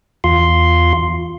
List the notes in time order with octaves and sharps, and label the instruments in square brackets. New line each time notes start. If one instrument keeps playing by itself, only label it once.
[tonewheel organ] E2 F4 C6